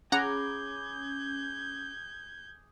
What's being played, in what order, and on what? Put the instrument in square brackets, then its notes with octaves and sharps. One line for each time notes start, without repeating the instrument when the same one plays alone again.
[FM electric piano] C#4 [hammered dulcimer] G#4 B5 D6 [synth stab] F#5 A#5 [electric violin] G6 G#6